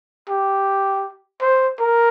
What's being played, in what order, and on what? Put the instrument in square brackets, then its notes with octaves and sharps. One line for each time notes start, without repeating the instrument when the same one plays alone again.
[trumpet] G4
C5
A#4